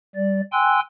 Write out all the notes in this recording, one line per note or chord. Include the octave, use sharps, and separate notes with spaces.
G3 D5
G5 G#5 C6 E6 F#6